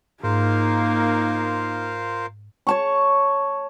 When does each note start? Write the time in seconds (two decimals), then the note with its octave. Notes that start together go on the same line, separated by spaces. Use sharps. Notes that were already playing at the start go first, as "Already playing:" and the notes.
0.24 G#2 A#3 D#4 F4 A#4 C5
2.67 C#5 A5 C#6